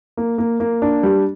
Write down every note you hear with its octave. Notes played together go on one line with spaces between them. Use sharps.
A#3
A#3
A#3
D4
G3